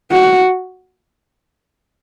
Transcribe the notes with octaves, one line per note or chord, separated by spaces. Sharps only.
F#4